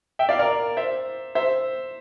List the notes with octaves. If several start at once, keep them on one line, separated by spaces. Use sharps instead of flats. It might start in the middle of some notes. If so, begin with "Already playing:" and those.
E5 G5
D5 F5
A#4 D5
C5 E5
C5 E5